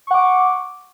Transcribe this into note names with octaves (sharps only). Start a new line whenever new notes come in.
F#5 C#6 D6